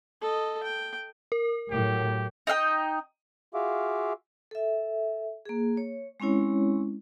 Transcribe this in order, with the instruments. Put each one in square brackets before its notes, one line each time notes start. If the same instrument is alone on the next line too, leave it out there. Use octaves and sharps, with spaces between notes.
[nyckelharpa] A4 D#5
G5
[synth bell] A#4
[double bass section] A2 F#3 [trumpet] G4
[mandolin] D#4 D#5 F5 G5
[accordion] F4 F#4 G#4 E5 F5 D6
[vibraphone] A4 E5
A#3 G#4
C#5
G#3 C4 C#4 E4 C#5